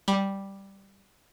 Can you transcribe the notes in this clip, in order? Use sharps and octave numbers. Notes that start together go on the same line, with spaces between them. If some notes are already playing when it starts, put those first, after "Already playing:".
G3